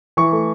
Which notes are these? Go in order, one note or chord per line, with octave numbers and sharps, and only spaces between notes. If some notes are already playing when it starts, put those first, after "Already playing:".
E3 C#6
A3